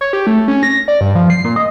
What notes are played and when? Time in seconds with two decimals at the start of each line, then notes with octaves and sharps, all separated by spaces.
0.01 C#5
0.13 G4
0.27 A3
0.48 C#4
0.63 A#6
0.88 D5
1.01 G2
1.15 F3
1.30 C7
1.45 A#2
1.56 D#5